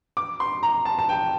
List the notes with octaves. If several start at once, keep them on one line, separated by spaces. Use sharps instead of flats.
D6
C6
A#5
A5
A5
G5